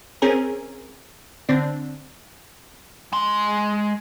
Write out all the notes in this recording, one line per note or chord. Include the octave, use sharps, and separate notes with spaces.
C4 C#4 G#4 A#4
D3 C4 D4
G#3 C6